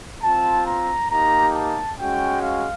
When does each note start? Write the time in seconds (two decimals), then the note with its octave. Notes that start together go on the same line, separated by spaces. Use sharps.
0.23 C4 F4 A5
0.67 A#5
1.11 A#3 D#4 G4 A#5
1.55 A5
1.99 G#3 C#4 F#4 G5
2.42 F5